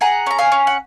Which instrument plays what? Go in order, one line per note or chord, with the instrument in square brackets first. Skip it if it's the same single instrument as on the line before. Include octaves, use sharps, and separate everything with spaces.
[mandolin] G#4 F#5 A#5
C#4 A#5
F5 G#5
C#4
F#5